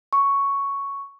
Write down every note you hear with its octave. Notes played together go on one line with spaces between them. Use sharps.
C#6